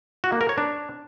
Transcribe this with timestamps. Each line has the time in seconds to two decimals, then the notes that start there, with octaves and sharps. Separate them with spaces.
0.24 F#4
0.32 A#3
0.41 A#4
0.49 C#5
0.58 D4